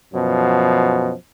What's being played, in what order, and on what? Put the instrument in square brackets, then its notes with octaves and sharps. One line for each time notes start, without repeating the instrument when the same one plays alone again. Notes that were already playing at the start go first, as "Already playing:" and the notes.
[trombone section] F#2 B2 F3